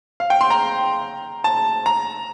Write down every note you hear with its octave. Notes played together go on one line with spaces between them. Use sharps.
F5
G5
C6
A#5
A5
A#5